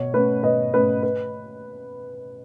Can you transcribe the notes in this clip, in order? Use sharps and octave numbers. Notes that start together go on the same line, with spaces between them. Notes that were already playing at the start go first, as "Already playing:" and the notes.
Already playing: B2 C#5
A3 C#4 B4
B2 B4 D#5
A3 C#4 B4
B4